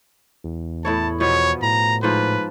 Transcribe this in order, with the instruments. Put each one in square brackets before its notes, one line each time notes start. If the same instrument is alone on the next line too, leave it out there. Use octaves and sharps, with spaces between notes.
[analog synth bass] E2
[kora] A2 E4 C#5 [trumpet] A5
[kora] B2 F3 B3 [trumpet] C#5
[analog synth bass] A2 [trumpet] A#5
[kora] G#2 F3 [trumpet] B4